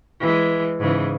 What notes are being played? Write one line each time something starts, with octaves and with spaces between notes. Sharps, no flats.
E3 G#3
G#2 C#3 E3